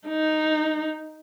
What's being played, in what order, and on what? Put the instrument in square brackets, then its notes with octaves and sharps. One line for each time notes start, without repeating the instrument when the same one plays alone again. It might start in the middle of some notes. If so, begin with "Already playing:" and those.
[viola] D#4